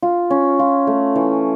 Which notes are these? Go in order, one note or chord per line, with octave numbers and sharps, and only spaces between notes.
F4
C#4
F4
A3
E3